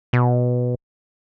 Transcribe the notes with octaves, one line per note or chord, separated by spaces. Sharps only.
B2